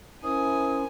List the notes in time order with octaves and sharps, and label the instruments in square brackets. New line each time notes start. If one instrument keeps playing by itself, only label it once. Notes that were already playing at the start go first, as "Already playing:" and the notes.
[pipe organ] C#4 [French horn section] E4 A#4 C5 [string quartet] G#5 [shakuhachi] D#6